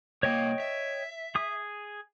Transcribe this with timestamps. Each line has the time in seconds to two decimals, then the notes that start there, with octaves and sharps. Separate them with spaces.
0.23 C2 A#3 C#5 D#5 G5
0.60 E5
1.35 G#4 D#6